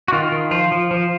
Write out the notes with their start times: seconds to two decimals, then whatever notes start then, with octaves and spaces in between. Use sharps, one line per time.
0.08 F#4
0.13 D#3 F4
0.32 D#3
0.51 F3 F4
0.72 F3
0.91 F3